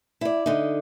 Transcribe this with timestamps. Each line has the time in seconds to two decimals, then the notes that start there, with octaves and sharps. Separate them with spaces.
0.21 E4 D5
0.46 D3 D#4